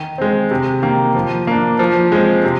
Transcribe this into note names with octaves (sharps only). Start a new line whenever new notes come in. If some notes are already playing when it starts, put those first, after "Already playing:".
Already playing: D#3
G#3 C4
C3
D#3 A#3
F3
A#3 D4
F3
G#3 C4
C3